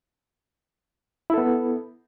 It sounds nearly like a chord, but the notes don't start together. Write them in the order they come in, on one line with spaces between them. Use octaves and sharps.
E4 A4 B3